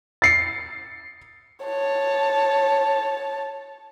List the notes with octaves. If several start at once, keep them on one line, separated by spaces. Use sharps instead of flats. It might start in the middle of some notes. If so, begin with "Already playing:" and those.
A6 C7 C#7
C#5 A5